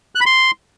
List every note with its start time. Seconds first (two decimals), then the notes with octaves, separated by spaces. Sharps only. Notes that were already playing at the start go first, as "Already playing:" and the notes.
0.15 F#6
0.21 B5
0.26 C6